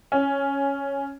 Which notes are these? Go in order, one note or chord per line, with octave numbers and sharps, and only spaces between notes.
C#4